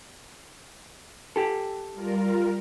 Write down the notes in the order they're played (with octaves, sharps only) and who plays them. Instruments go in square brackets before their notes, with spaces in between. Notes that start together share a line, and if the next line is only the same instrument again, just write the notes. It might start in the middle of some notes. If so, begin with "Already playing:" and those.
[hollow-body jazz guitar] G4 A4
[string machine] G3 F4 A#4